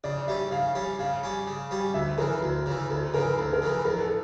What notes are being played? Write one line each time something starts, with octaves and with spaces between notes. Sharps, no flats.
C#3 D5
G3 C#4 E5
C#3 F5
G3 C#4
C#3 F5
G3 C#4
C#3
G3 C#4
D2 E5
C#3 E3 A#4
D2
C#3 E3
D2 A4
C#3 E3 A#4
D2 A4
A#4
C#3 E3
E2 A#4
A4